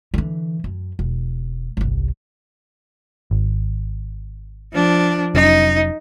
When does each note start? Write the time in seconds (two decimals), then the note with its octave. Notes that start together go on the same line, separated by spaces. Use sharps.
0.14 D3 E3
0.64 F#2
0.99 E1
1.77 G1 C2
3.31 G#1
4.73 F3 D4
5.35 F1 F#3 C#4 D#4